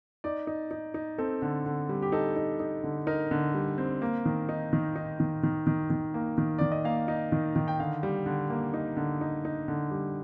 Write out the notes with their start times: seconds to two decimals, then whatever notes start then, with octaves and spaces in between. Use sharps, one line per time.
0.24 D#4 D5
0.47 D#4
0.71 D#4
0.94 D#4
1.18 C4 A4
1.42 D3
1.66 D3
1.89 G3
2.02 G4
2.12 D#4 A4
2.36 D#4
2.60 D#4
2.84 D3
3.07 D#4 A#4
3.31 D3
3.54 G3
3.78 C4
4.02 A#3
4.25 D#3
4.49 D#4
4.73 D#3
4.96 D#4
5.20 D#3
5.43 D#3
5.67 D#3
5.90 D#3
6.14 A#3
6.38 D#3
6.58 D#3 D5
6.72 D#5
6.84 A#3 F5
7.08 D#4
7.32 D#3
7.56 D#3
7.68 G5
7.80 D3 F5
8.03 G3
8.26 D3
8.50 A#3
8.74 D#4
8.97 D3
9.21 D#4
9.45 D#4
9.68 D3
9.91 G3